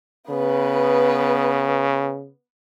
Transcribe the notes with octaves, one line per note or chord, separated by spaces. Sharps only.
C#3 B3 B4